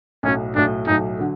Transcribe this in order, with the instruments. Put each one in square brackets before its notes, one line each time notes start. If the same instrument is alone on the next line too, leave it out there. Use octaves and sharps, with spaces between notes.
[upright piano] B1 A2 F#3 [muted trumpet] C#4
[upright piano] B1 A2 F#3 [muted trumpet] D4
[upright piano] B1 A2 F#3 [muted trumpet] D#4
[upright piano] D3 F#3